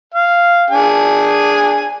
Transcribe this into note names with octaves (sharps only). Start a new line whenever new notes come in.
F5
D4 G#4 G#5